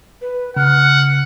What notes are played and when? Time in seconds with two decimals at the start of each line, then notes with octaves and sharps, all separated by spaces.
0.21 B4
0.57 C#3 F#5 F6